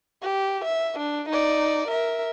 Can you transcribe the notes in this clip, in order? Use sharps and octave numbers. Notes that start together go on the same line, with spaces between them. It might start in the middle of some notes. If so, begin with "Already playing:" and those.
G4
E5
D4
D#4 D5
A#4 E5